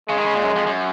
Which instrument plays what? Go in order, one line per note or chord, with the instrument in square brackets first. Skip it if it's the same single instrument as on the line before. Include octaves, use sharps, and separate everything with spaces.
[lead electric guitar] C#3 [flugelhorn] G#3
[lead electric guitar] D#3
C#3
A#2
F#2
F2
F#2